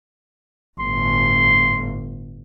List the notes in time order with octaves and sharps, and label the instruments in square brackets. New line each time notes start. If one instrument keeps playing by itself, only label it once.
[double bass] G1 A2 [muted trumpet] C6